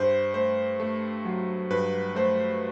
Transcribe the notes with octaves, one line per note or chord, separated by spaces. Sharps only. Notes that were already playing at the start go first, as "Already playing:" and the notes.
Already playing: G2 C5
A3 C5
A3
F#3
G2 B4
A3 C5